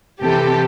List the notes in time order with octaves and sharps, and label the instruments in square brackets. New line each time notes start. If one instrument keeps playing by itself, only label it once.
[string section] C3 E3 G4 A4